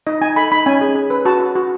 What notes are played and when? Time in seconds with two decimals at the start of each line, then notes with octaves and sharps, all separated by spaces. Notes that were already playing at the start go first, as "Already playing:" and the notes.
0.07 D#4 D#5
0.22 D#4 G#5
0.36 A4 B5
0.52 D#4 B5
0.66 C#4 G#5
0.81 G#4
0.96 G#4
1.10 B4
1.25 F#4 A5
1.40 F#4
1.55 F#4